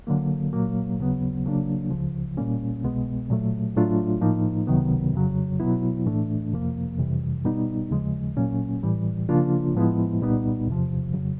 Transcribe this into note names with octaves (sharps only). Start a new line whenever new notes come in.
D3 F#3 A#3
A#2 F#3 A#3
D#2 C#3 F#3 B3
C#3 F#3 A#3 D4
C#2 C#3 F3
A#2 G3 A#3 C#4
C2 B2 G#3 B3
A#2 F#3 A3
A2 F#3 A3 D4 F4
A2 F3 A#3 D#4
C#2 C3 D#3 F#3 B3
F2 C#3 F#3
B2 F#3 B3 E4
A2 E3 A3 D4
F2 C3 F3 A#3
F2 C3 E3 G3
B2 G3 B3 D#4
D#2 C#3 F3 G#3
A#2 F#3 A#3 C#4
A2 E3 G3
C#3 F3 A#3 D4 F4
A2 F3 G#3 B3 E4
C2 A#2 G3 B3 D#4
E2 C3 F3
F2 C#3 F#3